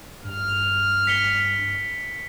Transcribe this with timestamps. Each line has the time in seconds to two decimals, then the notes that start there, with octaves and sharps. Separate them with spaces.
0.24 G2 F6
1.07 B6 C#7 G7